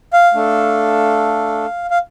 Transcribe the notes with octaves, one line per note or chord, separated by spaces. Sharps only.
F5
A3 D4 A4
F5